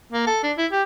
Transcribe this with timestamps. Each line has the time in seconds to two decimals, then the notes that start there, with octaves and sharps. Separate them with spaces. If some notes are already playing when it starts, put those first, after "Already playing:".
0.13 A#3
0.27 A4
0.43 D4
0.58 E4
0.72 G4